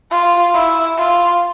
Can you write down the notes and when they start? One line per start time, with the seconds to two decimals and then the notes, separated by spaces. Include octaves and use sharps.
0.11 F4
0.54 E4
0.97 F4